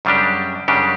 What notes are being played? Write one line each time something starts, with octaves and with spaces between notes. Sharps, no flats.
F#2 C#3 G3 D4 G4
F#2 C#3 G3 D4 G4